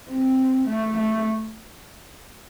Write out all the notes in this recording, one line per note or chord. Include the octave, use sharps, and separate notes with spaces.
C4
A3
A3